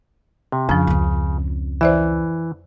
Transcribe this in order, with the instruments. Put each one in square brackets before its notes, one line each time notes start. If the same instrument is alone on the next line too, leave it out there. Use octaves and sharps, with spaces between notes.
[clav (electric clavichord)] C3
[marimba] F2 F3 [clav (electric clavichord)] C#3 [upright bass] D4
[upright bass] C#2 C4
[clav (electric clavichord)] E3 [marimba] C5 D5 E5